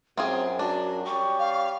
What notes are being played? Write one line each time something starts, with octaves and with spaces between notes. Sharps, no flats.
F#2 C4 F4 G#4 G5
D4 F#4
G3 C#4 G5 C#6
F5